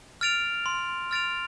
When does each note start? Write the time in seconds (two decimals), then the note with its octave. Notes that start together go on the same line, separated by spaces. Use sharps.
0.21 F6 A6 D7 F7
0.66 C6
1.11 F6 A6 D7 F7